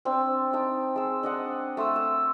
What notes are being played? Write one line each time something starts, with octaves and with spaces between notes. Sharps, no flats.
C4 D4 C6 E6
D#4 G5 A5
G#3 E6
D4 D#5 F#5
A3 C6 D#6 E6
E6